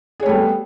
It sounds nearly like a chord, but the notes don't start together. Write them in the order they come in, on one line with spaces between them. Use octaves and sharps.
G#4 C#5 A3 G3 B3